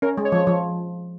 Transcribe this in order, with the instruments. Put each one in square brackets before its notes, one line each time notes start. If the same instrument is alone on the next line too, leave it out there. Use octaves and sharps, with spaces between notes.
[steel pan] C#4 [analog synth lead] A#4
[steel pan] G#3
[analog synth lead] C#5
[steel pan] F3
F3